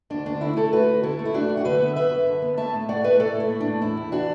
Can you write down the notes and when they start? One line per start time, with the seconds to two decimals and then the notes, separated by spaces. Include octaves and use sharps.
0.10 D2 D4
0.26 D2 D4
0.41 D3 E4
0.56 A3 E4 A4
0.72 D2 F#4 B4
0.88 D2
1.03 D3 E4 A4
1.19 A3
1.25 E4
1.34 F#2 D4 F#4
1.49 F#2
1.57 F#5
1.65 D3 B4 E5
1.80 B3
1.96 F#2 B4 E5
2.12 F#2
2.27 D3
2.42 B3
2.57 A3 E5 A5
2.73 A2
2.89 A3 D5 F#5
3.04 A2 B4 E5
3.19 A3 A4 D5
3.35 A2
3.40 E4
3.50 A3
3.60 D4
3.66 A2
3.82 E2 E4
3.97 E2
4.12 E3 D4 F#4